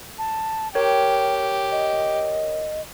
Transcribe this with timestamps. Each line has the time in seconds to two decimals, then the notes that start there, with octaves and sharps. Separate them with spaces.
0.18 A5
0.75 G4 A#4 C#5 G5
1.72 D#5